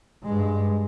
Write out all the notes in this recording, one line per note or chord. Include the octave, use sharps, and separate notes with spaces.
G2 G#3